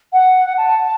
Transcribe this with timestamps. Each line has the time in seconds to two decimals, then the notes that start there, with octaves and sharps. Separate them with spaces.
0.13 F#5
0.58 A5